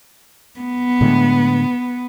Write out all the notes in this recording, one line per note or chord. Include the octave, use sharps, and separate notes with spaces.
B3
A2 D3 G#3